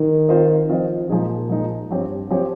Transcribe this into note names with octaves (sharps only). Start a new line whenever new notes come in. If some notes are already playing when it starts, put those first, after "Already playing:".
Already playing: D#3
C4 F4 C5 D#5
F3 C4 F4 C5 D#5
A#2 F3 G#3 D#4 G#4
F3 G#3 D#4 G#4
G2 F3 C4 G4 C#5
F3 C4 G4 C#5